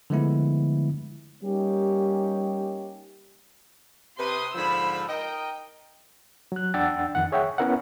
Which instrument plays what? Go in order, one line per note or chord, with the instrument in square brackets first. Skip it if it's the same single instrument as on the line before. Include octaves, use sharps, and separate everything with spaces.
[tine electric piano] D3 F3 G#3 A3 B3 E4
[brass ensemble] G3 A#3 C#4 D#4 G4
[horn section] C3 B4 [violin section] C6 D#6
[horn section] G#2 D3 F3 [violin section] B5 E6
[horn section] D#4 A#4 D#5 [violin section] G5
[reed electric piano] F#3 F#6
E2 D4 F#5 G5 E6 A6
F2 D#3 F#5
G#4 C#5 E5 F#5 G5
B3 C#4 E4 A#4 E5 F#5